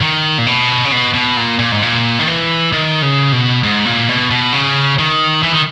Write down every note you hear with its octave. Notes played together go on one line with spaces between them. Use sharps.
D#3
A#2
B2
C#3
B2
B2
A#2
A#2
G#2
A#2
D#3
E3
D#3
C#3
B2
G#2
A#2
B2
B2
C#3
D#3
E3
D#3